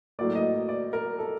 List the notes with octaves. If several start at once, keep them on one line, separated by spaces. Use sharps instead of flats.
A2 F#3 A#3 D5
D#5
D5
A#4
A4